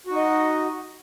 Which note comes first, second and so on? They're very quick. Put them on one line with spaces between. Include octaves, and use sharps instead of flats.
F#4 D#4 D#5